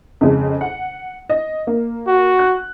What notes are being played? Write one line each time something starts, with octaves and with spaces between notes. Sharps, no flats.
F2 C#3 G#3
F#5
D#5
A#3
F#4
F#6